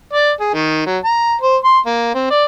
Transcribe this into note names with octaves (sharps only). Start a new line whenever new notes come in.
D5
G#4
D#3
F#3
A#5
C5
C6
A#3
C4
D5